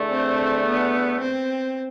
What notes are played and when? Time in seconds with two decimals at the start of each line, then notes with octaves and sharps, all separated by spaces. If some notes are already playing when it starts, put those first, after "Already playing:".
Already playing: E2 D3 A3
0.11 C4
0.66 B3
1.21 C4